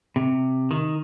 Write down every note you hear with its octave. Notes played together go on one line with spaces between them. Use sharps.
C3
D#3